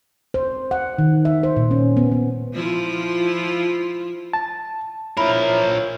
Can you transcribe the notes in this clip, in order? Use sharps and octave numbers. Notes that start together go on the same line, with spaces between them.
C5
F#5
D#3
E5
C5
A#2
C#4
B3
B3
F3 E4 F4
A5
F3 E4 A#4 C#5 B5